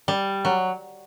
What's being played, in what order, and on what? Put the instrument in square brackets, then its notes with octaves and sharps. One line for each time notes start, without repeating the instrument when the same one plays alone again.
[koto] G3
F#3